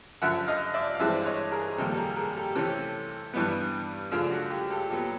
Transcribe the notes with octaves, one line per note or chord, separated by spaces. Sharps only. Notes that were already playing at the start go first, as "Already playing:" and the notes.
F#2 D3 F3 E5 F#5
D#5 F5
D5 E5
F5
G2 E3 G#3 C4 D5 E5
C#5 D#5
G#4 A#4
G#4
F2 C3 D#3 G3 A#3 G4 A4
A4
G#4 A#4
G#4 A#4
G4 A4
C3 E3 A3 C#4 G4 A4
G2 E3 G3 B3
F#2 C#3 F3 A3 D4 F4
F#4
F4 G4
G4 A4
A#2 F#3 B3 G4 A4